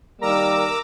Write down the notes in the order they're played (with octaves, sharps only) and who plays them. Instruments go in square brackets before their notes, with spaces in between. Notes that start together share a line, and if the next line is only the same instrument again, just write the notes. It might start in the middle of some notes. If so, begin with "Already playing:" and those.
[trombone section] D#3 G3 A#3 [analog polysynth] A#4 A#5 [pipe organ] D6 E6